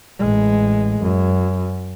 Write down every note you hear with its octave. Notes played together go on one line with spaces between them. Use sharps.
A1 G#3
F#2